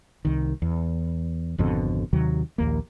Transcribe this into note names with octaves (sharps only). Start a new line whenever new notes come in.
C2 D#3
E2
G#1 F2 B2 D3
D#2 C3 D#3 F#3
A#1 D#2 A#3